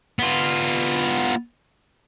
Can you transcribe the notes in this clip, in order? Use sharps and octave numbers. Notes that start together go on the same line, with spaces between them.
B3 F4